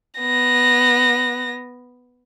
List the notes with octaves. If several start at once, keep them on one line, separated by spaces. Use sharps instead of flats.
B3 A#6